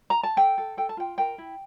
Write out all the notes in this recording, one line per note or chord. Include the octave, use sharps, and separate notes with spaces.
A#5
A5
A4 G5
A4
A4 G5
A5
F4 G5
A#4 G5
E4